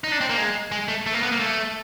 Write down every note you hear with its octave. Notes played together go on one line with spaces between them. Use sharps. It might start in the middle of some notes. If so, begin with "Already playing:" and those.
D#4
D4
C4
A#3
G#3
G#3
A3
A3
A#3
B3
A#3
A3